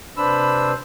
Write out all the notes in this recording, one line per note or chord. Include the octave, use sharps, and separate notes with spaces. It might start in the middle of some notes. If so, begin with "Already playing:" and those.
C3 D4 B4 C5 B5 E6